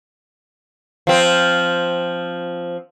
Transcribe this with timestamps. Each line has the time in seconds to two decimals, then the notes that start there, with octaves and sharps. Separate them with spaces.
1.07 F3 C4